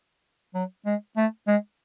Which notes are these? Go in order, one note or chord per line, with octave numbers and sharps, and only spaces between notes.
F#3
G#3
A3
G#3